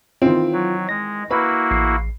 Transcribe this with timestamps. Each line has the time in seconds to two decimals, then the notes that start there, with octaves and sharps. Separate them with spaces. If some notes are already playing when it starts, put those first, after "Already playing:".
0.22 D#3 E3 C4 F4
0.53 F#3
0.89 G#3 A#6
1.31 A#3 E4 F#4 B4 B5
1.71 A1 C7